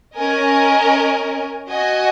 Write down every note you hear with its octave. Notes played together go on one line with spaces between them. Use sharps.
C#4 A#4 D#5 G#5
F#4 D#5 G#5